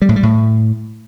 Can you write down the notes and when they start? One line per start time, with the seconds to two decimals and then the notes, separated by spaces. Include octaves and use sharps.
0.02 G3
0.09 A2
0.16 G3
0.23 A2